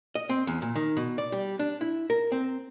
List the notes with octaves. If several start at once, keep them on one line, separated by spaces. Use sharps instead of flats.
D#5
C4
E2
A#2
D#3
B2
D5
G3
D4
E4
A#4
C4